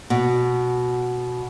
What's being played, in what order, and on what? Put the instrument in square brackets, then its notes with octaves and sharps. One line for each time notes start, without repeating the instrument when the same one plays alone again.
[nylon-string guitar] B2